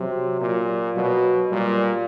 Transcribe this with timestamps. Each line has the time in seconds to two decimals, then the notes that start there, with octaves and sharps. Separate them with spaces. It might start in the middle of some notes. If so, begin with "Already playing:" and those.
Already playing: C3 F#3
0.41 A#2
0.96 B2 F#3
1.51 A#2 G3